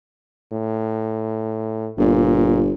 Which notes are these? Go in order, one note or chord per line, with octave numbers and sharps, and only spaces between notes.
A2
G1 A#2